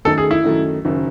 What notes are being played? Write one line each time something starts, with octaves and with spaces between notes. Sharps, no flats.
F#2 D#3 A3 D#4 A4
G#4
E4
F#2 D#3 A3 D#4
F#1 F#2 D#3